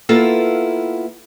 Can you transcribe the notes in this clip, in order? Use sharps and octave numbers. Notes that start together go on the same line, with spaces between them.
A#3 B3 E4 F4 A4